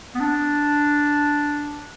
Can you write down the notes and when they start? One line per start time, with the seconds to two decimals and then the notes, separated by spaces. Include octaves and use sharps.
0.14 B3
0.20 D4